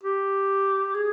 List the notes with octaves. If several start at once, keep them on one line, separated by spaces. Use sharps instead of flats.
G4
G#4